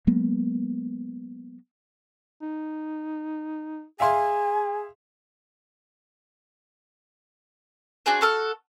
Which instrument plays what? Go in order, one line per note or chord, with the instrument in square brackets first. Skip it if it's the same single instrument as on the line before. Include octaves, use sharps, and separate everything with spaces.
[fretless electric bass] F#3 G#3 A#3 B3
[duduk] D#4
[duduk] G#4 [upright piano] E5 F5 C6 [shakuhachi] G#5
[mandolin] D4 F#4 G#4 C5
F#4 A4 F6